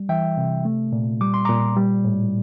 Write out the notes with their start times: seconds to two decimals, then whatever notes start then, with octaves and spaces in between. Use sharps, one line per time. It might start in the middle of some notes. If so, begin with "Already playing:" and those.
Already playing: G3
0.09 E3 E5 G5
0.37 C3
0.65 A3
0.92 A#2
1.21 G3 D6
1.34 C6
1.45 A#2 A#5 D6
1.77 G3
2.04 A2